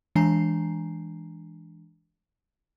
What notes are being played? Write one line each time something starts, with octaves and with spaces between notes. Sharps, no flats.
E3 G#3 D4 G#5 A#5 C7